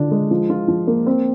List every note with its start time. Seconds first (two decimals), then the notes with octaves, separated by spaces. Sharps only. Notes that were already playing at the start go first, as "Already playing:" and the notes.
Already playing: D3 D4 F4
0.11 G#3
0.31 F3
0.50 F4
0.68 F3
0.87 A#3
1.06 C4